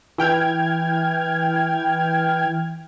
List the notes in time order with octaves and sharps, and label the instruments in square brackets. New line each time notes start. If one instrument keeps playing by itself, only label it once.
[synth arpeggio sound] E3 G5 F6 G#6